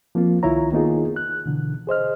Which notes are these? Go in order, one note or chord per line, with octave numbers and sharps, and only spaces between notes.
F3 A#3 C4 F4
C2 D#3 E4 F4 C#5 A#5
D#3 A#3 B3 D#4 F4 G#4
F#6
B2 D3 E3
G#4 C5 D#5 F6